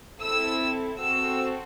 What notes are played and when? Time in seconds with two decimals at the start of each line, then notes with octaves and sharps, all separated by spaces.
0.21 C4 E4 A4 E6
0.99 C4 F#4 A4 E6